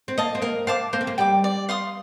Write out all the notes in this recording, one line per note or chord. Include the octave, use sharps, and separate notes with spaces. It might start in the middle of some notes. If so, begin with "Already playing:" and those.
C4
A#3 D#5 A5
C4
A#3 A#4
C4 F5 A5 D6
A#3 C5
C4
A#3
G3 G5 D6
D5
F5 C6 D#6